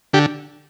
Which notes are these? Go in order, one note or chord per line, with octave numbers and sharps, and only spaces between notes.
D3 G4